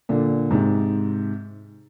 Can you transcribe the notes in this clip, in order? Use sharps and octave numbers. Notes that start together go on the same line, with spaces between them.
A#2 D3
G#2 C3